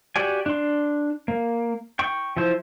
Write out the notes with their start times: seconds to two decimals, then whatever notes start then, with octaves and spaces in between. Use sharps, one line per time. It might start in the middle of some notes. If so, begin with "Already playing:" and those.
0.16 F#4 G4 D5 G#5
0.46 D4 C6
1.28 A#3
1.99 G5 C#6
2.37 F3 E4 C5